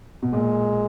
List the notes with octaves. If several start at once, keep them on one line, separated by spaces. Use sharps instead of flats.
B2
A#2 G#3